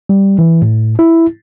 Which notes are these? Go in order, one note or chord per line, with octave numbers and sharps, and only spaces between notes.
G3
E3
A2
E4